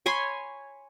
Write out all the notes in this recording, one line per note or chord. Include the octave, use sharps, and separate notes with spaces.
C#5 G#5 B5 C6